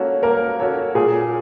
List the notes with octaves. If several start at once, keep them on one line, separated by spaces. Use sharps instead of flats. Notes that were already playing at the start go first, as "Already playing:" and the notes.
Already playing: A#3 C#4 F#4 A4 C#5
A#3 A#4
C#4 F#4 A4 C#5
A#2 G#4